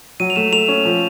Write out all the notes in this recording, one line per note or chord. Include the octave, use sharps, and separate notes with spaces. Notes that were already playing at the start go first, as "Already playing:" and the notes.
F#3 D#7
F7
A3 E7
A3 F7
C#4
F3